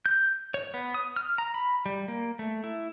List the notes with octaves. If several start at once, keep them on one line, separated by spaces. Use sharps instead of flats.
G6
C#5
B3
D#6
F6
A#5
B5
G3
A#3
A3
E4